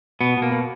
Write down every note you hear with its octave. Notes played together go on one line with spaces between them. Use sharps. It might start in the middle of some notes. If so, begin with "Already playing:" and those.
B2 B3
B2 A#3
B2